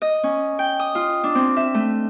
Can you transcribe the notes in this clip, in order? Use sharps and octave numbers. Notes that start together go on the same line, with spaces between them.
D#5
C#4
G5
D#6
F4
D4
C4
E5
A3